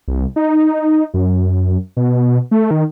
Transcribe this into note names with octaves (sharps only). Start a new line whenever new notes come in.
C2
D#4
F#2
B2
A3
D#3